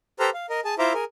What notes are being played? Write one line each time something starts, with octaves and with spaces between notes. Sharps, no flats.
G4 A4 B4 C5 A#5 F6
F5
A#4 D#5
G#4 A5
E4 F4 C5 E5 A#5 D6
G#4 A#4